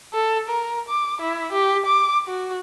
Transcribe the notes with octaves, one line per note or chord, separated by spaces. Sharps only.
A4
A#4
D6
E4
G4
D6
F#4